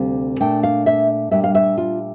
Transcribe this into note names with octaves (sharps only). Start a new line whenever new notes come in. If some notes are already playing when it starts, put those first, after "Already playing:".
Already playing: D2 C3 G3 C4 F5
A#2 A3 D4 G5
F5
E5
A#2 G3 D4 E5
F5
E5
F4